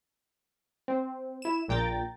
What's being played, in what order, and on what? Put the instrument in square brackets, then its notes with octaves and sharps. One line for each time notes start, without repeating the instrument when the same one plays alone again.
[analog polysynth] C4
E4 E7
A#1 A#2 G5 A#5 A6